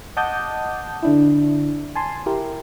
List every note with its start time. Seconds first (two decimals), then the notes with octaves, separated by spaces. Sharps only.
0.17 D#5 F#5 A5 D6 D#6 G6
1.03 D3 D4 E4
1.95 G#5 A5 C6
2.26 E4 G4 A#4